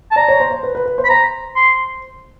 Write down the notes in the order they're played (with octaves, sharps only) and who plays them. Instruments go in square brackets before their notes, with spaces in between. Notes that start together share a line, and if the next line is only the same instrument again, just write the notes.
[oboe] A5
[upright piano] D5 [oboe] A#5
[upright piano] C#5
C5
C5
B4
B4
B4
C5
[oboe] B5
[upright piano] C5 [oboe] A#5
[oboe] C6